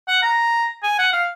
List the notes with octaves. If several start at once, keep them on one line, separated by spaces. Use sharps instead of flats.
F#5
A#5
G#5
F#5
F5